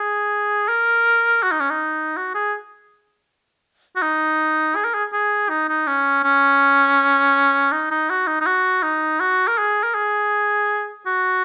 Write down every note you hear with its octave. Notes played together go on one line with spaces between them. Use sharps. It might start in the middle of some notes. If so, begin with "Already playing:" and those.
Already playing: G#4
A#4
F#4
D#4
C#4
D#4
F#4
G#4
F#4
D#4
G#4
A#4
G#4
G#4
D#4
D#4
C#4
C#4
D#4
D#4
F#4
D#4
D#4
F#4
D#4
F#4
A#4
G#4
A#4
G#4
F#4